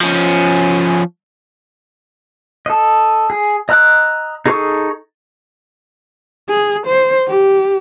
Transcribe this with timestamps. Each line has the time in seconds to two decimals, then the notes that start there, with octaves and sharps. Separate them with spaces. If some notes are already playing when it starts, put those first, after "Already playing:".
0.01 F3 C#4
2.66 A4 D#5
3.30 G#4
3.69 D#5 A#5 E6 F#6
4.46 D#4 G#4 A4 C#6 D#6
6.49 G#4
6.86 C5
7.28 G4